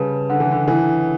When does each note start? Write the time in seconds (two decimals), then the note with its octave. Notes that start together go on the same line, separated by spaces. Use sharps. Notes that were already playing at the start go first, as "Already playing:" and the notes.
Already playing: C#3 G3 B4 A5
0.30 D3 F#5
0.40 E3
0.52 D3
0.68 E3 E4